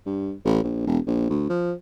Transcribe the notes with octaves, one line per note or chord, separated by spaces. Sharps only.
G2
A1
A#1
E1
A#1
D2
F3